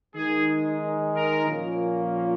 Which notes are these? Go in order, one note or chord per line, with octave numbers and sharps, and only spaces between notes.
D#3 G#3 D#4 G#4
A#4
A#2 F3 A#3 C#4